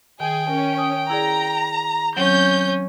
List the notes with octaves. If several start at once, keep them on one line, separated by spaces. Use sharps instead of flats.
D#3 G#4 G5
C#4 A#4
D#6
E4 G#4 D5 A#5
F#3 C4 C#4 G6